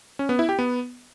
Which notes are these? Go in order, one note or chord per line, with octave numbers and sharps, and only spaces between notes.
C#4
B3
E4
G4
B3